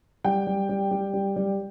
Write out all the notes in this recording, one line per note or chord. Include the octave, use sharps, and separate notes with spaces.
G3 G5
G3
G3
G3
G3
G3